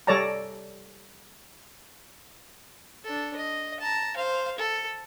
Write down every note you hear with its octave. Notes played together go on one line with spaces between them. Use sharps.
G3 A4 C#5 D5 A5 A#5
D4 A4
D#5
A5 A#5
C5 F5
A4